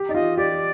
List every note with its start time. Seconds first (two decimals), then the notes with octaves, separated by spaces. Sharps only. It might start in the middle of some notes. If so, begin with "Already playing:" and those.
Already playing: G4
0.09 D#4 D5
0.14 F4 D#5
0.37 G4 D5